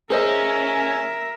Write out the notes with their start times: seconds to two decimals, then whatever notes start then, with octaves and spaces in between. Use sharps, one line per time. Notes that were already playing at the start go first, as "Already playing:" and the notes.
0.10 C#4 G#4 A#4 C5 D#5 E5